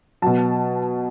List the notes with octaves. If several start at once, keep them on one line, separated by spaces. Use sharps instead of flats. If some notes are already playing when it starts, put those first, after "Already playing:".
B2 F#3 A5